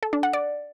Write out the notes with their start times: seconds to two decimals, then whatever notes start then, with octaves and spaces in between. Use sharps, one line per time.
0.03 A4
0.13 D4
0.23 F#5
0.33 D5